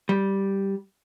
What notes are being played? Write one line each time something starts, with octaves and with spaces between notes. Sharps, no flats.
G3